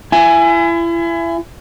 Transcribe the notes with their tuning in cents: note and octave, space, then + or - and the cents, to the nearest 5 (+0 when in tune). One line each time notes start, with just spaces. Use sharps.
E4 +35 G#5 +0